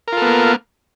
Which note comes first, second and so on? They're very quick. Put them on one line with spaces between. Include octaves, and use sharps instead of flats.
A#4 F4 A4 B3 A#3